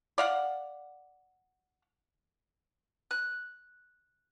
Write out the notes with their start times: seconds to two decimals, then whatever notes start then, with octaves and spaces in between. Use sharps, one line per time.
0.18 D5 F5 F#5
3.11 F#6